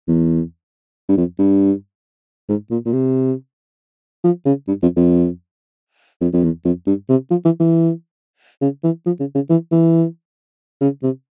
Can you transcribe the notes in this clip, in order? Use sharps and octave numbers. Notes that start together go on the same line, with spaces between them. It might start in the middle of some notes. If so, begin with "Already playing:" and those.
E2
G2
F2
G2
G#2
A#2
A#2
C3
F3
C#3
G2
F2
F2
F2
F2
E2
F2
G2
C3
F3
E3
E3
C#3
E3
F3
C#3
C#3
E3
E3
C#3
C3